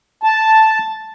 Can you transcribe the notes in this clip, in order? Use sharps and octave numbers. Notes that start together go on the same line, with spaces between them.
A5